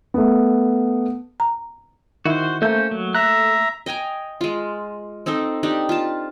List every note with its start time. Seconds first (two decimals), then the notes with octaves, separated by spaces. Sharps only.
0.14 A3 B3
1.40 A#5
2.25 D#3 E4 F#4 C5
2.62 A3 A#3 C#4 C5 G6
2.91 F#3
3.15 A4 E5 A#5 F#6
3.86 D#5 G5 G#5 A#5
4.41 G#3 F4
5.26 C4 D#4 A4 C5
5.63 D4 D#4 G4
5.89 F4 A5